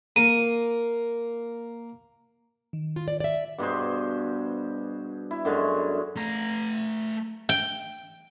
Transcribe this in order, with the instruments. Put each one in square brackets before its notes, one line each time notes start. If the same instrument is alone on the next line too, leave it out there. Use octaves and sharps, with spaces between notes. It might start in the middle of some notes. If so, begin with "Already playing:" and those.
[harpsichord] A#3 [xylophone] D#7
[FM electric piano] D#3
[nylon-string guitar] F4
D5
D5 E5
[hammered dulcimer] G2 B2 G#4 C5
E4
F#2 D3 G#3
[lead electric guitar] A3 A#5
[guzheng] G5